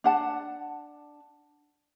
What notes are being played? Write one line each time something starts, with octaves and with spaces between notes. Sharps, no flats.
D4 F#5 A5